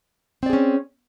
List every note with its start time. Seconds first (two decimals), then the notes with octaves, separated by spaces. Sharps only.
0.43 C4
0.46 D5
0.50 G#4
0.53 C#4